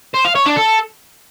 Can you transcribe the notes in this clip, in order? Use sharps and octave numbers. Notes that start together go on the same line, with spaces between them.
C5
F5
C#5
D4
A4